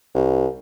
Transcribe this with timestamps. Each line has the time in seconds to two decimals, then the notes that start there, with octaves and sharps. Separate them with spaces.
0.15 C2